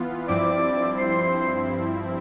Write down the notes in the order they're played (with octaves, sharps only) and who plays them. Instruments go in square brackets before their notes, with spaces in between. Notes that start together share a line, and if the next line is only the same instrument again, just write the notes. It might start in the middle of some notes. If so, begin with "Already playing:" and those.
Already playing: [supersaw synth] E3 B3 F4
[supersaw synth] G2 F3 C4 E4 [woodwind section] D5 D6
[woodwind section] C5 C6